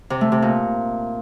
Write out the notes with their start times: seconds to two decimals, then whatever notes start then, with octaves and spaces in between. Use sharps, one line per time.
0.10 C3
0.21 A3
0.32 C3
0.42 A#2